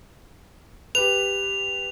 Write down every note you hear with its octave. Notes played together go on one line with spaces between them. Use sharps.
G4 B4 F7